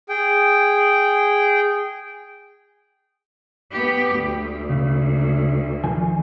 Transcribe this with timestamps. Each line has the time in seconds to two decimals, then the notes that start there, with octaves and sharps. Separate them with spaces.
0.09 G#4 G5
3.72 B3 G4
4.14 D2
4.70 C#3
5.84 D#3 F3 G#5